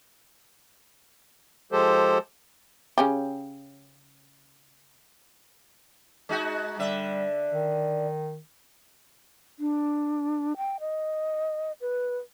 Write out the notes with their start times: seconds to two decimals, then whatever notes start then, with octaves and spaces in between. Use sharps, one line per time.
1.72 F3 G#3 G4 A4 C5
2.98 C#3 C#4 G4
6.29 G#3 D#4 F#4
6.79 D3 G3 E5
7.52 D#3
9.59 D4
10.57 G5
10.80 D#5
11.81 B4